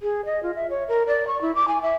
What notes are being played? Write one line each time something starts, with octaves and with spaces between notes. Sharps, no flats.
G#4
D#5
F4
E5
C#5
A#4
D5
C#6
E4
D6
G#5
E5